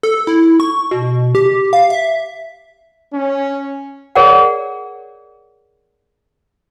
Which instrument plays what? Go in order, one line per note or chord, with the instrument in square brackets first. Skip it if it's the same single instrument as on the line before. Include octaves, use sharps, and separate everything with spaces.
[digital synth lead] A4
E4
C#6
B2
G4
F5
E5
[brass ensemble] C#4
[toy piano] G#4 A#4 C#5 D5 F#5